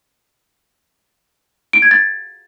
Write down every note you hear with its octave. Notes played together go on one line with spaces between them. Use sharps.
D7
G#6
A6